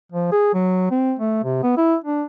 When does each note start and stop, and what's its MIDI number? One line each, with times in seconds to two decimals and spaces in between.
0.12 0.30 53
0.32 0.54 68
0.54 0.88 54
0.91 1.14 60
1.19 1.42 57
1.44 1.63 48
1.63 1.76 59
1.77 1.96 64
2.04 2.24 62